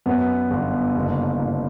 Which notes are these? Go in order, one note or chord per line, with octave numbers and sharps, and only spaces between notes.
F#2 B3
G1
F#1
F#1